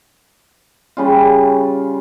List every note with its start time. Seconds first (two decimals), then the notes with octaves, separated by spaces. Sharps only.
0.97 C#3 G3 C#4 F4